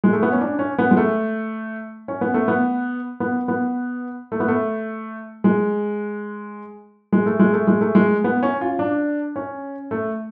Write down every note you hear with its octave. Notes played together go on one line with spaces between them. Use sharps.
G#3
A3
B3
C#4
D4
C#4
B3
G#3
A3
C#4
B3
A3
B3
B3
B3
A3
B3
A3
G#3
G#3
A3
G#3
A3
G#3
A3
G#3
B3
C#4
F4
D4
C#4
A3